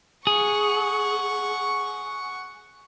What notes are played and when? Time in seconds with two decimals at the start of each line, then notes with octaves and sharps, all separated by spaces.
0.27 G#4 F#5 C#6